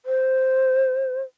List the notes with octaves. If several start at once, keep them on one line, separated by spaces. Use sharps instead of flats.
C5